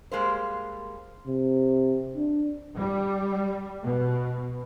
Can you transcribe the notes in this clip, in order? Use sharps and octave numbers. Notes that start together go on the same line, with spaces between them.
G3 G#3 A#3 C5
C3
D4
G3
B2